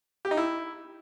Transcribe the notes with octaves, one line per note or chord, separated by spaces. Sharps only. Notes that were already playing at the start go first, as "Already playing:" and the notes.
G4
D#4
E4